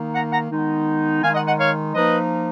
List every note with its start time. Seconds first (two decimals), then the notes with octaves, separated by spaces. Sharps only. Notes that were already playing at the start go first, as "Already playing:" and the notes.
Already playing: D#3 A#3 D#4
0.15 F#5 A#5
0.32 F#5 A#5
0.50 D#3 G#3 B3 D#4
1.23 D#3 G#3 D#4 F5 G#5
1.35 D#5 F#5
1.48 D#5 F#5
1.59 C#5 F5
1.95 F3 A#3 D#4 B4 D#5